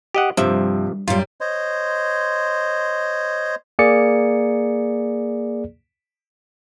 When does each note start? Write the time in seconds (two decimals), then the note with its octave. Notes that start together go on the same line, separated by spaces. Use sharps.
0.15 G4 D#5 F#5
0.37 G2 C3 F3 E5
1.08 F#2 G3 F4
1.41 C5 C#5 D#5 C6
3.79 A#3 G#4 D5 C#7